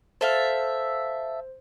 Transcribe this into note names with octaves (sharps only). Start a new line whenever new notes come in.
A4 C5 E5 F5